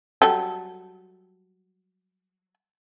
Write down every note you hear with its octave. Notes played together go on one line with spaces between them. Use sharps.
F#3 G3 A4